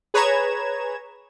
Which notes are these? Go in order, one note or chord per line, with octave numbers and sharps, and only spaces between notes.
G#4 B4 C#5 A#5 G#6 E7